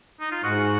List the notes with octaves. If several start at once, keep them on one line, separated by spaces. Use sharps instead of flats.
D#4
F4
G#2 F#4